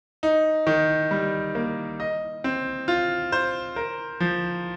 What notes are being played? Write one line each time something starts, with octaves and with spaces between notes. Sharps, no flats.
D#4
D#3
G3
A#3
D#5
C4
F4
C5
A#4
F3